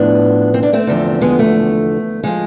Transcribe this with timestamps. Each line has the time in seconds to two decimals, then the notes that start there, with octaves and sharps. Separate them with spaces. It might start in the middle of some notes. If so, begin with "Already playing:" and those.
Already playing: A2 F3 B3 D4
0.54 C4
0.63 D4
0.73 A3 C4
0.87 E2 D3 F3
1.21 G#3 B3
1.39 A3
2.23 F3 G#3